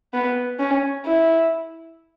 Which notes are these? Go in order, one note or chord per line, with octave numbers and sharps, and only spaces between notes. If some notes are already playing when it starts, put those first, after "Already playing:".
B3
C#4
E4